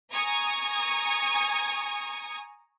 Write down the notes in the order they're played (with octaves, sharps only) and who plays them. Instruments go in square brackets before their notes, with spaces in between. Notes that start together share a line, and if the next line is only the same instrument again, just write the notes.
[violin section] G#5 A#5 C#6 D#6 G#6